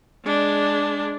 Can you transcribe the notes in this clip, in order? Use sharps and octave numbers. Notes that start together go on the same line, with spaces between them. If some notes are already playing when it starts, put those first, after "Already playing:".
G#3 D4